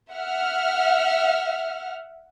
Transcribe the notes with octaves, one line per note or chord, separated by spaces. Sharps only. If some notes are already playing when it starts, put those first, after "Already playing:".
E5 F#5 F6